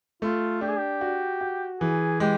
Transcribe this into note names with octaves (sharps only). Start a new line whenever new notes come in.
A3 F4
D4 G4
G#4
G4
F#4
F#4
E3 G#4
G#3 G4